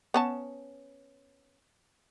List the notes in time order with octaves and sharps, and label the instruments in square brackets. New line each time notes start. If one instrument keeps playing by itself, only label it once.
[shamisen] B3 C#4 A5